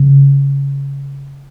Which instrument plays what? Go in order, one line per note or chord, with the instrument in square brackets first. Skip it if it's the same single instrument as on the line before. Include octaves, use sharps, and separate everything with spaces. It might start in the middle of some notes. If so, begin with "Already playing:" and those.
Already playing: [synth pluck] C#3